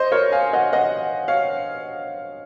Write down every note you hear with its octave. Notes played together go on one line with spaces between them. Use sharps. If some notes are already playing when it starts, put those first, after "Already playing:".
Already playing: C5 D#5
A#4 C#5
F5 G#5
D#5 F#5
D#5 F#5
C#5 F5